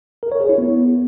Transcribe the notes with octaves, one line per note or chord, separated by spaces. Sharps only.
A#4
C#5
G#4
E4
B3